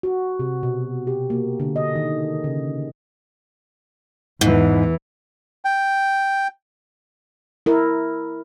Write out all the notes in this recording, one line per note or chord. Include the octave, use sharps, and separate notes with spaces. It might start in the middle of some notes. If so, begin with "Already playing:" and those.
F#4
C3
B2
G4
A#3
D3
D#5
D#3
C#3
E2 G#2 E3
G5
E4 A#4